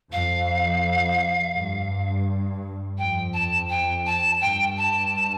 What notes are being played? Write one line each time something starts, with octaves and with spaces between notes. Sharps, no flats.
F2 F5
G2
F2 G5
A5
G5
A5
G2 G5
A5